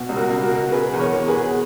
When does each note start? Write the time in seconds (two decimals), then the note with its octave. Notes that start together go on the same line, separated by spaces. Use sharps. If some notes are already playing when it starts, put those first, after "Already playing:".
Already playing: B2
0.09 C#2
0.16 F#4 A#4
0.29 C#2
0.43 F#4 A#4
0.51 B2
0.71 B2 G#4 B4
0.93 E2
0.99 A#4 C#5
1.14 E2
1.28 G#4 B4
1.35 B2